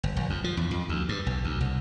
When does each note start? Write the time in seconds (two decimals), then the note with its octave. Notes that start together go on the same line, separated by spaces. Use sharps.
0.03 G1
0.17 A#1
0.30 F2
0.44 F3
0.57 E2
0.71 F2
0.89 D2
1.09 G2
1.26 B1
1.45 D2
1.61 C2